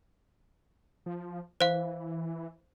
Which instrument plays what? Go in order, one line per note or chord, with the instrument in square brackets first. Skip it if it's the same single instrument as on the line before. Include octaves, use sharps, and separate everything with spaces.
[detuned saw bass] F3
[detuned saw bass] E3 [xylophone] C5 F5